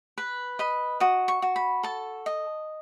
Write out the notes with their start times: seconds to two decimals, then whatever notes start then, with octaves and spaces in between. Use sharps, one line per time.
0.18 B4
0.59 D#5 B5
1.00 F#4 D#6
1.28 C#6
1.42 F#4
1.56 B5
1.83 A4 A5
2.26 D#5